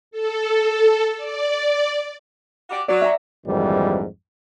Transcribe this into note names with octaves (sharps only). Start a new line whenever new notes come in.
A4
D5
F#4 G4 D5
F#3 D5
E5 A#5
A#1 F2 G#2 D#3 E3 G3